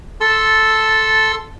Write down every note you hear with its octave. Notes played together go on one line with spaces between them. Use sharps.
A4 A5 C6 E6